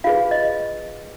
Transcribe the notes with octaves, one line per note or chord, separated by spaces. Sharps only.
F4 G#4 B4 F5
D#5